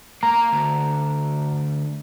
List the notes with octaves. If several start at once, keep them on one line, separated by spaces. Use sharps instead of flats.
A#3 A#5
D2